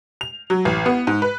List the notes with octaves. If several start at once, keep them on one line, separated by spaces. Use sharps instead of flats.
F7
F#3
A1
B3
G#2
B4